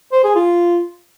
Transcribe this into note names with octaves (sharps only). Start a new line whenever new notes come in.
C5
G#4
F4